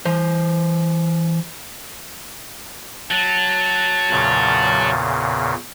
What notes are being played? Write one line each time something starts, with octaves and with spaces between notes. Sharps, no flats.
E3 C5
F#3 F#4 A5
E2 A#2 C#3